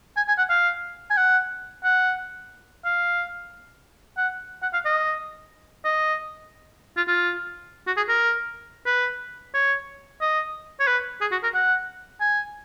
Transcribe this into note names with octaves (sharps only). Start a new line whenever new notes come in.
G#5
G#5
F#5
F5
G#5
F#5
F#5
F5
F#5
F#5
F5
D#5
D#5
F4
F4
F#4
G#4
A#4
B4
C#5
D#5
C#5
B4
G#4
F#4
A#4
F#5
G#5